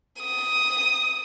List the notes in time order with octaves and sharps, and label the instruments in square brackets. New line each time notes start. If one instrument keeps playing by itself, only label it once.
[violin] D#6